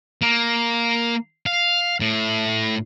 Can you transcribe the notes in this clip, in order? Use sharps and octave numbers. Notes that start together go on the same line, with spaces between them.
A#3
F5
A2